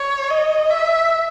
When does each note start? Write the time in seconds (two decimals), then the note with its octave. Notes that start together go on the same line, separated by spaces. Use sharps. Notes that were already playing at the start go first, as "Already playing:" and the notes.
Already playing: C#5
0.30 D#5
0.70 E5